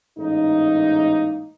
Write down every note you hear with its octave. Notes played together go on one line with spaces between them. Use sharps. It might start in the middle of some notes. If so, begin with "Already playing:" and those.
A1 G#2 A#3 D#4